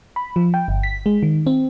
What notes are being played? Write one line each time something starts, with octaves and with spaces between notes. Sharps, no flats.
B5
F3
G5
G1
B6
G#3
D#3
C4